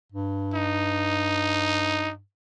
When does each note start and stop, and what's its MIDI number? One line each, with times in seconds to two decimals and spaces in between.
0.12 2.20 43
0.54 2.12 63